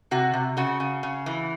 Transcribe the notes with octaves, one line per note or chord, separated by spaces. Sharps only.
C3 F#4
C3
C#3 F#4
C#3
C#3
E3